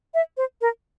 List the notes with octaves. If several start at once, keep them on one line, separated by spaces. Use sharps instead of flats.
E5
C5
A#4